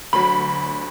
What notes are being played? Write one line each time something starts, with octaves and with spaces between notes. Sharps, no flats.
D2 D3 F#3 B5